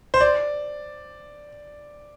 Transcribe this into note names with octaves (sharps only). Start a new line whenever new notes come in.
C5
D5